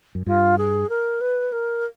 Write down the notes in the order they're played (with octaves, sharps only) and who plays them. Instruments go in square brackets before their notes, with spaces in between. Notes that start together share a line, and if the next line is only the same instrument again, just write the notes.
[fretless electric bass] F#2
[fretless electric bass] G2 [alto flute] F4
[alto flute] G#4
A#4
B4
A#4